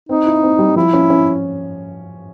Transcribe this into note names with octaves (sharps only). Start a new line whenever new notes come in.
C4 D#4
E4
C4
G3
F3 E4
C#4
C#4